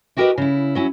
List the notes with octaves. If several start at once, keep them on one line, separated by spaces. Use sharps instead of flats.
E4 F#4 G4 A#4 B4 D#5
C#3 E4
F#3 C#4 E4